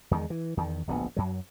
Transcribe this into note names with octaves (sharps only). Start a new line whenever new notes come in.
E2 D#3 G#3
E3
E2 D#3
D1 A#1 B3
F#2 F#3